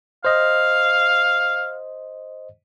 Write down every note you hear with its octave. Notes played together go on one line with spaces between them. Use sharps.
C5 D#5 F5